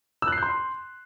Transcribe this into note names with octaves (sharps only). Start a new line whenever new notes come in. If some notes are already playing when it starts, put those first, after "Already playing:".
E6
F#6
C7
G6
C6